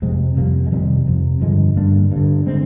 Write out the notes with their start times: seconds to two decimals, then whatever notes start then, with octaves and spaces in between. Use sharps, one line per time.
0.02 F2 C3 G#3 C4
0.37 F2 C3 G3 A#3
0.66 G#3
0.72 F2 C3 D#3 G3
1.07 F2 C3
1.41 G2 D3 F3 G#3
1.76 G2 D3 A#3 D4
2.12 G2 D3
2.46 D3 G#3 C4